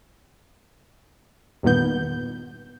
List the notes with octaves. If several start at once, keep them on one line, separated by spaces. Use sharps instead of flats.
E2 G2 A#2 D#3 B3 G6